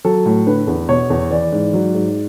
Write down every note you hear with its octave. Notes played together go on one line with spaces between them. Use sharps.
F#3 A4
A2
D3 B4
E2
B2 C#5
E2
E3 D5
G#2
F#3
G#2